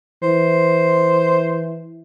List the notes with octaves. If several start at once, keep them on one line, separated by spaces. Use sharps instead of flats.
E3 C5